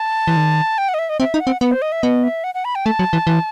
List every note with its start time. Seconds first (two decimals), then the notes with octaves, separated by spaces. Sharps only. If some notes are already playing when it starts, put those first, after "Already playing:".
Already playing: A5
0.28 E3
0.37 D#3
0.78 G5
0.89 F#5
0.94 D#5
0.99 E5
1.09 D#5
1.20 C4 E5
1.34 D#4
1.40 F#5
1.47 C4
1.61 B3 F#5
1.71 C5
1.82 D#5
1.92 E5
2.03 B3 D#5
2.24 E5
2.44 F#5
2.55 F#5
2.65 B5
2.75 G5
2.86 A3 A5
2.99 F#3
3.13 E3
3.27 E3